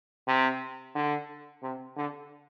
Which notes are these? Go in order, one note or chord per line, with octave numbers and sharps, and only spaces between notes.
C3
D3
C3
D3